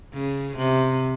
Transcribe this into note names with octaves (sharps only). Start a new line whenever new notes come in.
C#3
C3